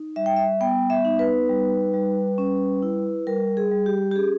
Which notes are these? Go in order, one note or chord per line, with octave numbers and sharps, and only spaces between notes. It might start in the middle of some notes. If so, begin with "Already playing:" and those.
Already playing: D#4
G3 E5
G5
E5
B3 G5
E5
D#4
B4
G3
G3
C#4
E4
G3 A#4
G#4
G3
G4
G4
C#4 G#4